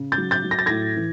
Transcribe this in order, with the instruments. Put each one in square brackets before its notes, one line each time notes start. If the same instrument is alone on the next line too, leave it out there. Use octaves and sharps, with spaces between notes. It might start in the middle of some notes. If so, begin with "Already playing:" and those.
Already playing: [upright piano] C#3
G6 A6
F#3
G6 A6
F#3
A#6
A6
A2 G#6 A#6
E3